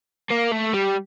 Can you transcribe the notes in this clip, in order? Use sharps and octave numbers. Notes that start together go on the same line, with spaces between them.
A#3
A3
G3